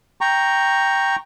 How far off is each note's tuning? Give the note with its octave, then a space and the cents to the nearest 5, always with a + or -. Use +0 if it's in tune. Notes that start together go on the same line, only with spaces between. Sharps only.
G5 +0 A#5 +0 C#6 +0